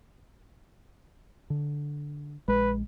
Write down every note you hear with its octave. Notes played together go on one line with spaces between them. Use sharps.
D3
A#1 G#3 B4